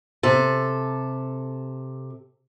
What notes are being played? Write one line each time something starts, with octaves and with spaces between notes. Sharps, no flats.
C3 A4